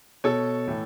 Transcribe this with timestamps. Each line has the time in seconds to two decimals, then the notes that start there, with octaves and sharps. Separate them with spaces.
0.24 B2 A4 C#5
0.67 A2 E3